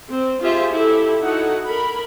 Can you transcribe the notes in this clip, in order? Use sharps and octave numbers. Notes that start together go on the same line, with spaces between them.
C4
F4 G4 G#4 C5 E5
E4 G4 A4
D#4 E4 F#4 A4 F#5
A#4 B5